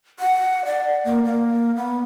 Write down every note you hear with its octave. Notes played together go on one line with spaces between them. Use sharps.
F#5
D5
A#3
A#3
B3